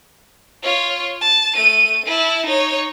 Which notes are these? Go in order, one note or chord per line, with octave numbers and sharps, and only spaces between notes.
F4 C#5
A5
A3 D#7
E4 A5
D#4 C#5